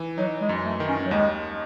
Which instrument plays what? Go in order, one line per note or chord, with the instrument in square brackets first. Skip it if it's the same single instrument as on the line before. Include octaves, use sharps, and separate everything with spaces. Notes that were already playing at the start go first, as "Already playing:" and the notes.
Already playing: [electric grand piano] E3
[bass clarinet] F#3 [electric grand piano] D#4
[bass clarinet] G#3
[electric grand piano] F#2
[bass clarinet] A3
[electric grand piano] D#3
[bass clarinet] C#4
F#3
[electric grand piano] D#2 [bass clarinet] G#3